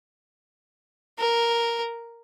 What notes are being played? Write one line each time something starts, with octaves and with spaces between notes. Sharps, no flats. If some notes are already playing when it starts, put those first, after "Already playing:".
A#4